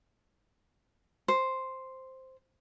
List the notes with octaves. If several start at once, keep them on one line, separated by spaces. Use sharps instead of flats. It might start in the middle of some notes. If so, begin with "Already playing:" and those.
C5